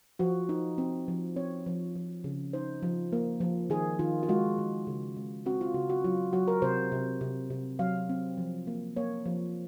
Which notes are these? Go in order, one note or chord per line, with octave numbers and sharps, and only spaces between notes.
F3 F#4
D#4
C4
F3
C4 C#5
F3
F3
C#3
D#4 C5
F3
A#3
F3
D#3 G#4
D#3 F4
F4
G#3 F#4
D#3
C#3
G#3
C4 F#4
F4
C#3 F#4
F#4
F#3 F4
F#3 F#4
A#4
C3 C5
C3
C3
C3
F#3 F5
C4
F3
A#3
A#3 C#5
F3